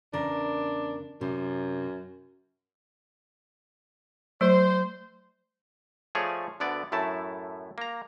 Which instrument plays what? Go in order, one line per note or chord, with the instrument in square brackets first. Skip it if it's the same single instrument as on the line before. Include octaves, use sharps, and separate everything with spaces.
[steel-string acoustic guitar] E2 C#3 A#4 [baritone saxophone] D4
[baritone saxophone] F#2 [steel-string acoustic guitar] C3
[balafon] F#3 A3 [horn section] C5
[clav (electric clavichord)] F3 A3 G#4 C#5 D5
D2 D3 B3 D5
F#2 A2 A3 E4 A5
A#3 A#5